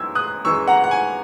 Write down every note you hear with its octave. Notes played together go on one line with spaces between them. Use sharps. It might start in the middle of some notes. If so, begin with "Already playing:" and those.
Already playing: F#2 E3 G#3 E6 G#6
D#6 F#6
F#2 E3 G#3 C#6 E6
F#5 A#5
F#5
G#5